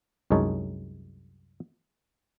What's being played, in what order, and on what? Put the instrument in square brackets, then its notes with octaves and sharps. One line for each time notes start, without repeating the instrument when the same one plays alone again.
[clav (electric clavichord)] C2 F#2 G#3 D#4 C#5 A5